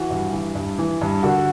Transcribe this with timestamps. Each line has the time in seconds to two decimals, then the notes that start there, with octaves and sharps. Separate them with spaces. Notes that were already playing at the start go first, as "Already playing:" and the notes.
Already playing: E3 F#4
0.10 G2
0.33 E3
0.55 G2
0.79 E3
1.01 G2
1.23 D3 F#4